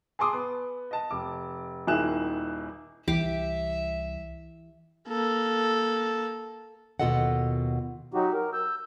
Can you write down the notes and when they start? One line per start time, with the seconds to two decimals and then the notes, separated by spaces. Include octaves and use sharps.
0.19 G#4 A5 C6 D6 D#6
0.33 B3
0.91 D#5 A5
1.11 F1 D6
1.87 D#1 D#3 E4 G#4 F#6 E7
3.08 C2 E3 G4 E5 D6
5.08 A#3 A4
7.00 D#2 B2 F4 A4 D#5 F#5
8.14 F#3 D#4 F#4 G4
8.33 A#4
8.53 E6 G6